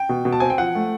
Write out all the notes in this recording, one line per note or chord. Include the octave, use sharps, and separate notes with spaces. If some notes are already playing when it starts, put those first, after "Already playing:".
Already playing: G5
B2
B2
A5
C4 G#5
G5
F3 F#5
A3